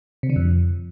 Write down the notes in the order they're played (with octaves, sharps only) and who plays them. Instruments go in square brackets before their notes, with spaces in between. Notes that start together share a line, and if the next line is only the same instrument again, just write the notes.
[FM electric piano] C3
D3
F2